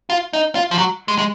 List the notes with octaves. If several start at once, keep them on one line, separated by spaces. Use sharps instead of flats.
F4
D#4
F4
F3
F#3
G#3
G#3